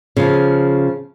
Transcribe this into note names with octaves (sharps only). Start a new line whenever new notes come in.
C#3 F3